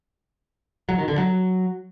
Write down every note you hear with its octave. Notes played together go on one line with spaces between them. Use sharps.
F#3
D#3
D3
F#3